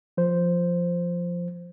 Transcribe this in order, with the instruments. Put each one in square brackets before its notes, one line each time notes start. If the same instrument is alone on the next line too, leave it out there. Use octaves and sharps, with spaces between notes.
[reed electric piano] F3 C5